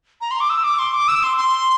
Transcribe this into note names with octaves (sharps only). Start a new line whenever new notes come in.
A#5
C6
D6
E6
D6
C6
D6
E6
C6
C6